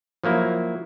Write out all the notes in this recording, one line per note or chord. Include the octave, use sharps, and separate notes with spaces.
F3 F#3 A#3 E4